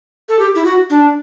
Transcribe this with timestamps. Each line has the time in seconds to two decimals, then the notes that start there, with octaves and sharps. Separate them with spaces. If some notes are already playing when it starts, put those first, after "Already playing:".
0.29 A4
0.39 G4
0.55 E4
0.65 F#4
0.90 D4